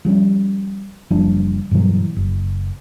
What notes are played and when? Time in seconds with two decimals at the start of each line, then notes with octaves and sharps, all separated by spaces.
0.05 F3 G3 C4 C#4
1.10 F#1 F3 G3 D4
1.71 G2 B2 E3 F#3
2.16 F#1